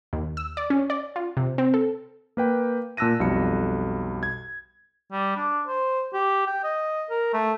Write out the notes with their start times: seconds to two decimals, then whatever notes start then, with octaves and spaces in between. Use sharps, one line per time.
0.13 D#2
0.37 E6
0.57 D5
0.70 C#4
0.90 D5
1.16 F4
1.37 C3
1.58 C4
1.74 A4
2.37 A#3 B4 G5
2.97 A#2 A5 E6 F#6 A#6 D#7
3.20 B1 F2 G3 C#7
4.23 G#6
5.12 G3
5.37 D4
5.67 C5
6.13 G4
6.47 G5
6.63 D#5
7.10 A#4
7.33 A3